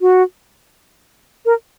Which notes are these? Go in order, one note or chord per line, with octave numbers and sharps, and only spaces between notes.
F#4
A#4